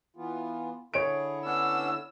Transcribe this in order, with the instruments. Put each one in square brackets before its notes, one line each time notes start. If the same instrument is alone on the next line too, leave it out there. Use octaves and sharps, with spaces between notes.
[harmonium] E3 B3 F4
[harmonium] D3 E4 [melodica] G#4 [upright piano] C#5 D7
[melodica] B3 C#4 D4 [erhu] E6